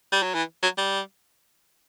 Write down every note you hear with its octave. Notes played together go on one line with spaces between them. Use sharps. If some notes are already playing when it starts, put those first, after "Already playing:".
G3
F#3
E3
F#3
G3